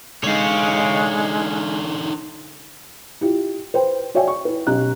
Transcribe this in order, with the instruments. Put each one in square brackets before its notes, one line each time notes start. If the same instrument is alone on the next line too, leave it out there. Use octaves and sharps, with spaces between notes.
[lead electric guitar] D3 D#4 [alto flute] G#3 [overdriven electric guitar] C#5 F5
[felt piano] E4 F4 G4
B4 C5 G5
F#4 C#5 D5 E5 G5 G#5
C#6
E4 B4
B1 C#4 G4 D#5 A#5 F#6